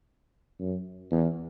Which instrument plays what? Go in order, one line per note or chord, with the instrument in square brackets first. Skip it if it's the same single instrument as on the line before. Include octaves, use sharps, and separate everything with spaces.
[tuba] F#2
E2